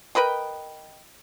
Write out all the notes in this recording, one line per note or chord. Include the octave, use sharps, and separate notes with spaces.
A#4 B4 D#5 G5